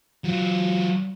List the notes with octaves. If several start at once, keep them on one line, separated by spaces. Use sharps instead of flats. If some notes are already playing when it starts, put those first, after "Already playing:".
F#3 F4